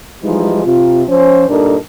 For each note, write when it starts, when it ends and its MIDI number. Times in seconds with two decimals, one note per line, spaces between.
0.23 0.62 52
0.23 0.62 53
0.23 0.62 55
0.23 0.62 56
0.23 0.62 63
0.65 1.03 48
0.65 1.03 65
1.08 1.44 53
1.08 1.44 61
1.08 1.44 72
1.49 1.76 43
1.49 1.76 46
1.49 1.76 62
1.49 1.76 63
1.49 1.76 69
1.49 1.76 70